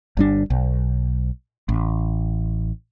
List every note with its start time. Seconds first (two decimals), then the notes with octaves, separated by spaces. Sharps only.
0.17 G1 G3 D4
0.50 B1
1.69 A1